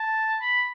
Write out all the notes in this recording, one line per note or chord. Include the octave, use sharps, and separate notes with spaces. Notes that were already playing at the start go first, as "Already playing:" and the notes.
Already playing: A5
B5